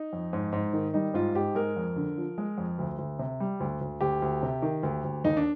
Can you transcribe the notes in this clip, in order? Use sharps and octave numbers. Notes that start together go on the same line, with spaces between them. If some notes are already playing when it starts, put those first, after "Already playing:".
Already playing: D#4
F2
G#2
G#2
D#3
G3 D#4
G#2 F4
G#2 G4
G#3 A#4
F2
D3
F3
G#3
F2
D2
D2
C3
G3
D2
D2
D2 G4
D2
C3
D#3
D2
D2
D#2 D#4
D4